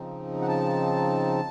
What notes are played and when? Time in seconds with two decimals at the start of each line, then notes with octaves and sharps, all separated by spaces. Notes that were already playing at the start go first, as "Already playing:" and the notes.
Already playing: C#3 F3 C4 D#4
0.41 F#5
0.48 A5